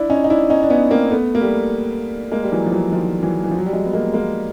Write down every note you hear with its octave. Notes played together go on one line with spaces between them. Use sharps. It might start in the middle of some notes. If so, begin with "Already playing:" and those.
Already playing: D4 E4
C#4 D#4
D#4
D4 E4
C#4 D#4
D4
B3 C#4
A#3 C4
A3 B3
A#3
G3 A3
G#3 A#3
G3
E3 F#3
F3
E3 F#3
D#3 F3
E3 F#3
E3
F3
F#3
G3
F#3 G#3
B3
G#3 A#3
G#3 A#3